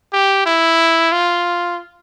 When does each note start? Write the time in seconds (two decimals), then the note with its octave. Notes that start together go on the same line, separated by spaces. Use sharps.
0.13 G4
0.46 E4
1.12 F4